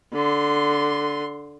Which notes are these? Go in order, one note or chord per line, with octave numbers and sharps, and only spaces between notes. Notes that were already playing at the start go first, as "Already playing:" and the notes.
D3 C6